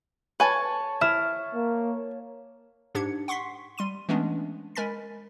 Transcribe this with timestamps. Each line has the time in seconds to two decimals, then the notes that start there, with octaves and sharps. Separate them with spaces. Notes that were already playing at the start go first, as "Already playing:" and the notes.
0.40 B4 C#5 G#5 A5
1.01 E4 F6 E7
1.54 A#3
2.95 G#2 D4 G4 G#6 C#7
3.28 F#5 C6 C#6 B6 C7
3.78 G3 C6 D#7
4.09 E3 G#3 A3 B3 C#4 D4
4.75 G#3 A#4 G#5 B5 A6 B6